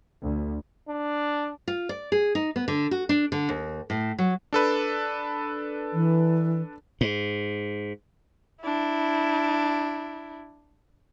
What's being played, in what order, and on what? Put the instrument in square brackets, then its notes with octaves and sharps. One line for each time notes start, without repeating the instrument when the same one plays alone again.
[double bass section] D2
[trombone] D4
[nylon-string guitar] F4
D5
G#4
D#4
B3
D3
F#4
D4
D3
D#2
A2
F#3
[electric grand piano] D4 A4 B4
[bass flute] E3
[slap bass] G#2
[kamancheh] D4 E4